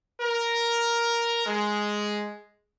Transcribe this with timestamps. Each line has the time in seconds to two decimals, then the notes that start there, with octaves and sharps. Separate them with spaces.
0.21 A#4
1.45 G#3